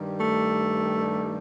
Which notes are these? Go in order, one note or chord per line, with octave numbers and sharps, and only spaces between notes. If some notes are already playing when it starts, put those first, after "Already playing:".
Already playing: G2 D#3 G3
A3